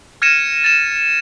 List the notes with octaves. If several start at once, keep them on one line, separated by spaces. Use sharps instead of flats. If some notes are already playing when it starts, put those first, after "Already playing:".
F6 G#6 A#6 C#7 D#7 E7
A6 E7